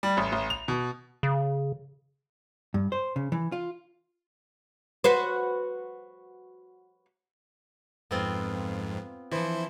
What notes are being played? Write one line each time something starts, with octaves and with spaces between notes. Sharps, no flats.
G3
A1
A1
F7
B2
C#3
G2
C5
C#3
E3
F4
F#4 B4 C5
F2 G#2 B3 C4 F4
E3 F3 E4 C5